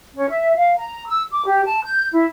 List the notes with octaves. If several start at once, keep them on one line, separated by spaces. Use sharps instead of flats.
C#4
E5
F5
A#5
E6
D6
G4
A5
G6
E4